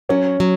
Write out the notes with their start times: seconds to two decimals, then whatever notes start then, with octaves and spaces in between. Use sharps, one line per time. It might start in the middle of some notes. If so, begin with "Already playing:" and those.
0.09 F#3 C#4
0.40 F#3